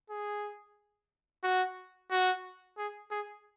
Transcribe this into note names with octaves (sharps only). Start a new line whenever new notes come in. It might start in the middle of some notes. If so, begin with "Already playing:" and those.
G#4
F#4
F#4
G#4
G#4